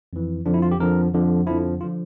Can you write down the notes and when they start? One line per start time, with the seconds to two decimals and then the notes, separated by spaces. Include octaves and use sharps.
0.13 F2 E3
0.46 F2 D3 F3 D4
0.54 E4
0.62 F4
0.71 G4
0.79 F2 D3 F3 A#4
1.14 F2 D3 F3
1.47 F2 D3 F3 E4
1.81 D3 F3 F4